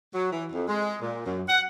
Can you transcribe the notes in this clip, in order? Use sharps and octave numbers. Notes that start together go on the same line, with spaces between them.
F#3
E3
F2
G#3
A#2
F#2
F#5